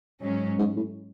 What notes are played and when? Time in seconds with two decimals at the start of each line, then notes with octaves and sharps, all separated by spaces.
0.23 G#2 F#3 C#4
0.59 G#2
0.76 A2